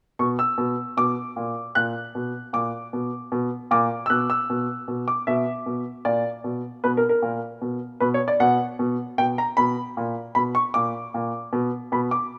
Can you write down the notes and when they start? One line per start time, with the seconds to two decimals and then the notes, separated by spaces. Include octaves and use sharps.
0.19 B2 C#6
0.39 E6
0.58 B2
0.97 B2 D6
1.36 A#2
1.75 A#2 F#6
2.15 B2
2.53 A#2 D6
2.93 B2
3.32 B2
3.71 A#2 D6
4.06 E6
4.10 B2 F#6
4.30 E6
4.50 B2
4.88 B2
5.08 D6
5.27 B2 E5
5.66 B2
6.05 A#2 D5
6.44 B2
6.84 B2 B4
6.97 A#4
7.09 A#4
7.22 A#2
7.62 B2
8.00 B2 B4
8.14 C#5
8.28 D5
8.40 B2 F#5
8.79 B2
9.18 B2 G5
9.38 A#5
9.57 B2 B5
9.97 A#2
10.35 B2 B5
10.55 C#6
10.74 A#2 D6
11.14 A#2
11.53 B2
11.92 B2 B5
12.11 D6